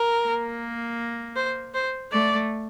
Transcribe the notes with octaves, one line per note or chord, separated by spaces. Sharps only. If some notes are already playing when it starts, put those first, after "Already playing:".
Already playing: A#4
A#3
C5
C5
A3 D5